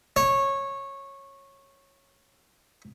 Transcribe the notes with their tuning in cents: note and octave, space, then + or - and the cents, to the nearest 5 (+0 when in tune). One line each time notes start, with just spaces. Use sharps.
C#5 -15